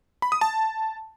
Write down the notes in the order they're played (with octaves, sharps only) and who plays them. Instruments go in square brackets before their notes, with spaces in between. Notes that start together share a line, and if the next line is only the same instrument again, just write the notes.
[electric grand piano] B5
D#6
A5